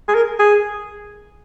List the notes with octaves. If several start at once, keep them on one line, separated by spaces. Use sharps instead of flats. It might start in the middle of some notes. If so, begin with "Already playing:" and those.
G#4
A#4
G#4